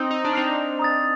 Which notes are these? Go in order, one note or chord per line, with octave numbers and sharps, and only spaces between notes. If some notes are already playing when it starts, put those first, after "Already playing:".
Already playing: C4 D#4
D#4
D4
C4 D#4 F6 C7 F7
A#5 D#6 A6